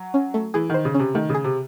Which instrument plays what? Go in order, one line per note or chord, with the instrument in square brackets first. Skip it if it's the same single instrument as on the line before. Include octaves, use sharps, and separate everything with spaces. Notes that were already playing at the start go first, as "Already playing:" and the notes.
Already playing: [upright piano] F#3
[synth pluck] C#4
A3
[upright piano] E3 [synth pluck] G#4
[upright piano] D#3 [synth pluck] C5
[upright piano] C#3
[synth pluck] C#4
[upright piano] C3
[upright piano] D#3 [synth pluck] A3
[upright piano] C#3 [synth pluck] G#4
[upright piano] C3